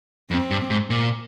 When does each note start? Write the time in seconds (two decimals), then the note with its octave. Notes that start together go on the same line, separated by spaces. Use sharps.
0.31 F2 C4
0.51 G2
0.70 G#2
0.90 A#2